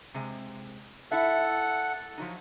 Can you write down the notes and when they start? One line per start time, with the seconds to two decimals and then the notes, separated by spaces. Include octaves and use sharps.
0.14 C3 G#3
1.11 E4 A4 E5 F#5
2.18 F3 F#3 D#4